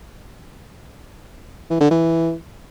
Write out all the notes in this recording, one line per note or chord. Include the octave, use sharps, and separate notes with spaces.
E3
D3
E3